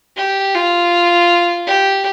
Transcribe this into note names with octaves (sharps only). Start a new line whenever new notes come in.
G4
F4
G4